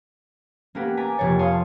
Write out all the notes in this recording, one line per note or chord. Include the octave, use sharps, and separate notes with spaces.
A#3 B3 C#4 G4 A#4 B4
G#5 A#5 D6 A6 B6
F1 A#3 G4 C#5 A6
C#5 F5 A5 C6 D#6